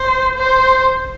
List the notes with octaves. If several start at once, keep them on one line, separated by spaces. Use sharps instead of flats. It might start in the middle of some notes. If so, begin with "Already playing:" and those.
Already playing: C5
C5